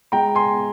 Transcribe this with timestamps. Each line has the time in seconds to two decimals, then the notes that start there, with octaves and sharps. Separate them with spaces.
0.12 G#3 G5 A#5
0.35 G#5 C6